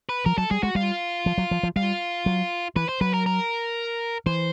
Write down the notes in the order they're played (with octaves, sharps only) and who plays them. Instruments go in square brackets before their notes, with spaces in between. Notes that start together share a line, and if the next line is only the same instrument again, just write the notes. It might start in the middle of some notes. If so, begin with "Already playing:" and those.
[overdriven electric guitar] B4
[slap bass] F3 [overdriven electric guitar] A#4
[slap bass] F#3 [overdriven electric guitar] A4
[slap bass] G3 [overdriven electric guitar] G#4
[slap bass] G#3 [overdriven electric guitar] F#4
[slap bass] G3 [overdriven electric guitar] F4
[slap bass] F3
F#3
F3
F3
[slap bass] G3 [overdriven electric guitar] F4
[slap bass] F#3
[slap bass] E3 [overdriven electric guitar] B4
[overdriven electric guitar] C5
[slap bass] F#3 [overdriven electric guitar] B4
[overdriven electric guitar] A#4
A#4
[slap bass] E3 [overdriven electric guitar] C5